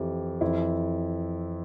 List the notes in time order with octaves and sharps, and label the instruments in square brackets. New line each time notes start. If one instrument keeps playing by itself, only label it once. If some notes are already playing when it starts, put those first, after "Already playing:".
Already playing: [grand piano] F2 E3 E4 G4
F2 E3 E4